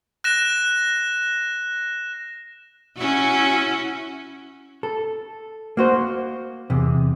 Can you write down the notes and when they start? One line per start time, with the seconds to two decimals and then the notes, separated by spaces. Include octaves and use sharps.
0.24 F#6 A#6 E7
2.97 C#4 E4 F#4
4.83 A4
5.77 A#3 F#4 C5
6.70 E2 C3